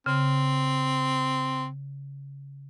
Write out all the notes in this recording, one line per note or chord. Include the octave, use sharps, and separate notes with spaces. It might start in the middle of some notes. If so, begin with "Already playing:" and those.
C#3 C4